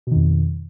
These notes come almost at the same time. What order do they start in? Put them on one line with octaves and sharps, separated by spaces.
B2 D#3 F2